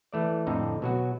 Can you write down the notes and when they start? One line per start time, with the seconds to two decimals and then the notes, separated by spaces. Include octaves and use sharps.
0.13 E3 A3 D5
0.47 F2 A2 D3 C4 D#4
0.82 B2 F#3 F#4